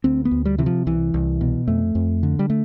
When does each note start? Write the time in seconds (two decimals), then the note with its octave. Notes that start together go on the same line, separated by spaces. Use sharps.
0.04 D2 C4
0.25 B3
0.31 D2
0.45 G3
0.58 C3 E3
0.66 F3
0.86 C2 E3
1.14 C2
1.41 B2
1.67 F2 A3
1.95 F2
2.23 D3
2.39 G3
2.50 A3